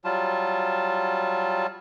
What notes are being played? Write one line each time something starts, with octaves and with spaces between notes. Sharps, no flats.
F#3 G3 F4 A5